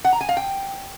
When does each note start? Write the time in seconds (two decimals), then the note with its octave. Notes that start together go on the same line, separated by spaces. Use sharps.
0.04 F#5
0.13 A#5
0.21 G#5
0.29 F5
0.37 G5